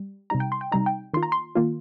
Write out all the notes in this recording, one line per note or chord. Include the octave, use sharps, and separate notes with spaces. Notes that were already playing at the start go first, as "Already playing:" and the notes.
Already playing: G3
C3 G3 D#4 A#5
G5
C6
G5
C3 G3 D#4 A#5
G5
D#3 A#3 F4 C6
A#5
C6
D#3 A#3 F4